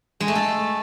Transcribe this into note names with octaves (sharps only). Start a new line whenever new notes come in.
G#3
A3
A4